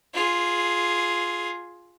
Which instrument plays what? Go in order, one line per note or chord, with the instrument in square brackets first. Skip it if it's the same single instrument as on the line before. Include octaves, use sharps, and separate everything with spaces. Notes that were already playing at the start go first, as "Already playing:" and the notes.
[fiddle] F4 G#4